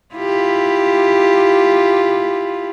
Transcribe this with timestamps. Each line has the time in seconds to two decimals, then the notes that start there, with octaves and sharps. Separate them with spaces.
0.15 E4 F4 G4